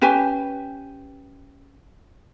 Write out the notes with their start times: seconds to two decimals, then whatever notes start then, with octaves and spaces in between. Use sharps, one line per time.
0.01 C#4 G4 B4 G#5